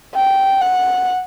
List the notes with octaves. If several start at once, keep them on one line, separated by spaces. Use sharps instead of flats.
G5
F#5